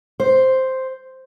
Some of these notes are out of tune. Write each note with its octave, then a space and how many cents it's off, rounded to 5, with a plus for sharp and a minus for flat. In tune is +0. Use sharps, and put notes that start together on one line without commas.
C5 +0